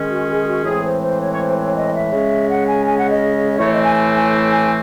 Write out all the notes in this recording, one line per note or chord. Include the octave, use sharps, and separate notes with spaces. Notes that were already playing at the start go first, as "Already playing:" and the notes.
Already playing: D#3 G#3 C#4
F#4
G#4
F#4
A2 E3 G#3 C4 G#4
C5
C5
C#5
C#5
C5
C#5
D#5
E5
C#3 G#3 C#4
F#5
G#5
G#5
F#5
D#5
A2 E3 A3 C4 C#5
D#5
G#5
G#5
G#5
G#5